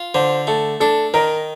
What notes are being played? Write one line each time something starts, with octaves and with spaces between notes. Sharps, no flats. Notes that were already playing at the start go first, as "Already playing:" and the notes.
Already playing: F4
D3 C5
A3 A4
D4 A4
D#3 A#4